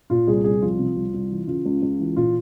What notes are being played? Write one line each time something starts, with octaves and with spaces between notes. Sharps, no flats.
A#2 F4
C2 G#4
C2 G#4
F3 F4
C3
C2
C2
E3
C#3 F4
C#2
C#2
E3
A#2 F4